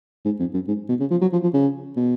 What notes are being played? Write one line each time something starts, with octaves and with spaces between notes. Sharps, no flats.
G#2
F2
F#2
G#2
B2
C#3
F3
F#3
F3
F3
C#3
B2